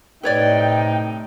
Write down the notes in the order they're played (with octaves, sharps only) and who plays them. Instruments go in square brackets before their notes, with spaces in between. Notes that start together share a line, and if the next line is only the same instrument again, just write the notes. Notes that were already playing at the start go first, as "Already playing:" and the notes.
[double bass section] A2 [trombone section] C3 D#4 [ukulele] B4 C#5 D5 [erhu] G5